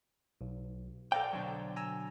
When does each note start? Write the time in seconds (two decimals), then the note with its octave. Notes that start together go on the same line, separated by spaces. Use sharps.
0.41 B1
1.12 A4 C5 D5 F5 G5 A#5
1.33 B2 D3 F#3
1.76 G#5 A#5 E6